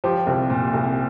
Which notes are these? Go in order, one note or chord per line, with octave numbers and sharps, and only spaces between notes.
F3 G4
C2
A#2
C2